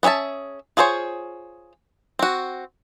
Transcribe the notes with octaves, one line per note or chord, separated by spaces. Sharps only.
B3 C#4 G#4 E5 A5
F4 G#4 A4 C5 C#5
C4 F#4